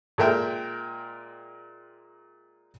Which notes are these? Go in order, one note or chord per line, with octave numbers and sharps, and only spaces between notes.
A#2 G#3 A#4 E5 G5